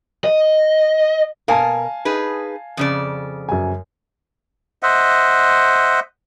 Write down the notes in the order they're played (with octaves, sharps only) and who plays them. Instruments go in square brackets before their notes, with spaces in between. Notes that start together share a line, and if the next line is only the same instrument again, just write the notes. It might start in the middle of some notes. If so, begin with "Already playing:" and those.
[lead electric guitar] D#5
[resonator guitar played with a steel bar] B2 A#4 [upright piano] F5 G#5 A5
[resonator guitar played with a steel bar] D#4 G#4 B4
F2 C#3 D5
[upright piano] F#2 G#5
[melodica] C5 D#5 E5 F#5